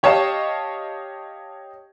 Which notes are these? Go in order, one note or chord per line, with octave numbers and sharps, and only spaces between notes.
G4 C#5 D#5 F5 A5